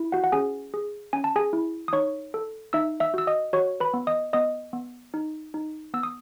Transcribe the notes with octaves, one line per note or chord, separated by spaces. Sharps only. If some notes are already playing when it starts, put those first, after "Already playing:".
Already playing: E4
F#4 F#5
F#5
C#4 G#4 G#5
G#4
C#4 G#5
A5
G#4 G#5
E4
D#6
D#4 C#5 C#6
A4
D#4 E5 E6
E5 E6
F#4 E6
D#5 D#6
F#4 C#5 C#6
B4 B5
B3
D#5 D#6
B3 D#5 D#6
B3
D#4
D#4
B3 E6
D#6